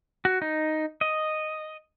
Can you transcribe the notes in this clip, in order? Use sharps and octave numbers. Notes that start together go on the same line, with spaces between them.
F#4
D#4
D#5